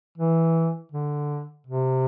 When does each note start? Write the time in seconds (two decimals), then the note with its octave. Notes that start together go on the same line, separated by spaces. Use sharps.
0.18 E3
0.92 D3
1.67 C3